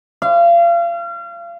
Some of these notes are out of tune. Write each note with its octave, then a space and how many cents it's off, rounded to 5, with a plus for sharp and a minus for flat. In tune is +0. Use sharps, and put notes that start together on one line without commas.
F5 -35